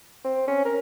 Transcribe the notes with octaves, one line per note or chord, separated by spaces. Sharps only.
C4
C#4
A#4